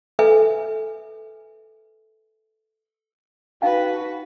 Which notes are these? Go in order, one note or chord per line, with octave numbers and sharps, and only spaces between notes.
A4 B4 E5 G#5
D#4 F#4 B4 F5 G5